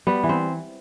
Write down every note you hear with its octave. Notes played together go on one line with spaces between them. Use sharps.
G3 B3
E3
C4